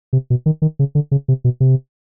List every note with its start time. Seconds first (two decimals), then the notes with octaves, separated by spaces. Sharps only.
0.13 C3
0.30 B2
0.46 D#3
0.62 D#3
0.79 C#3
0.95 D3
1.11 C#3
1.28 C3
1.44 B2
1.60 C3